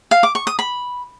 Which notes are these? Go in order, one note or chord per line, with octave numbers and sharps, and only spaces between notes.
F5
D6
C#6
D#6
B5